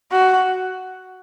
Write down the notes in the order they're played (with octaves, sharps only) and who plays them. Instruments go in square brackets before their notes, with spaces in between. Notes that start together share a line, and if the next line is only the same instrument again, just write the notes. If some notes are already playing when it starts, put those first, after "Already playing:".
[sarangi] F#4